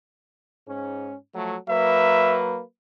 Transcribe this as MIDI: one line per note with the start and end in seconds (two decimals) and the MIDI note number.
0.67 1.14 44
0.67 1.14 61
1.34 1.56 53
1.34 1.56 54
1.34 1.56 57
1.68 2.61 54
1.68 2.61 58
1.68 2.61 71
1.68 2.38 76